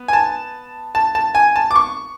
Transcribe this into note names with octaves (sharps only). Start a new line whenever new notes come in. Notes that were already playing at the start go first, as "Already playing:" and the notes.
Already playing: B3
G#5
A5
A5
A5
G#5
A5
D6
C#6